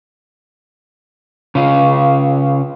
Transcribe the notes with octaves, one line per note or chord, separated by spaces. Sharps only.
C#3 F4